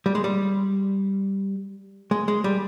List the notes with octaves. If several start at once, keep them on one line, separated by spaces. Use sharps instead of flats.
G3
G#3
G3
G#3
G#3
G3